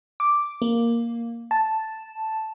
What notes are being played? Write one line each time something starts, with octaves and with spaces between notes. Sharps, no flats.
D6
A#3
A5